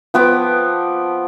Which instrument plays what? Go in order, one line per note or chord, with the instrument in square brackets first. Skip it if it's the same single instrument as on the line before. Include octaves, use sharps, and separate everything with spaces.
[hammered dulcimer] F3 B3 G5 D6